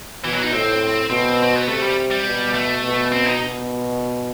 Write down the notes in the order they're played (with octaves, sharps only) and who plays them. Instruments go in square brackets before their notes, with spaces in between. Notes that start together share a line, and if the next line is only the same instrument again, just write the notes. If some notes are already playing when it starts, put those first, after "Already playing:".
[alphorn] B2 [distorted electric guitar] E3
[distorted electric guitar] F#3
D#4
[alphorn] A2 [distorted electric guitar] C4
[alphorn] B2 [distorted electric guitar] C4
[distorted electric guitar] C4
B3
[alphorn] C3 [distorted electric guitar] A3
[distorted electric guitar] G3
G3
[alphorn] B2
[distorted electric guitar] A3
[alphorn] B2
[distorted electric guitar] C4
D#4
[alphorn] B2